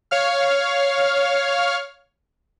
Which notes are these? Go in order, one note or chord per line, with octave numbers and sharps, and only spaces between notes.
C#5 F5 F6